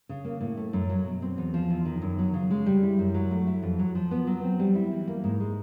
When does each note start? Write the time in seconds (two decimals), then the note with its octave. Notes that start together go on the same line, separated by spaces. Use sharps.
0.09 C#3
0.25 A#3
0.41 A2
0.57 A3
0.73 F#2
0.89 F#3
1.05 B2
1.22 C4
1.38 E2
1.54 F3
1.70 E2
1.85 D#3
2.02 F#2
2.19 F#3
2.34 C#3
2.50 G#3
2.66 G3
2.83 E4
2.99 F#2
3.14 F#3
3.31 A3
3.47 E4
3.63 F2
3.79 F#3
3.95 F3
4.11 B3
4.27 F#3
4.43 C4
4.59 G3
4.75 E4
4.92 E3
5.08 A#3
5.24 G#2
5.40 G#3